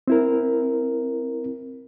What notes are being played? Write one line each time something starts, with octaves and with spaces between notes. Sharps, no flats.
C4 E4 A#4